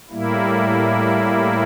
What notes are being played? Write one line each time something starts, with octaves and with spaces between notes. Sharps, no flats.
A2 G3 A#3 E4